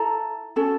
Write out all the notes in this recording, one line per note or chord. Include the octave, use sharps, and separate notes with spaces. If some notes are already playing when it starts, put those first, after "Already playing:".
Already playing: E4 A4 A#5
C#4 F#4 A4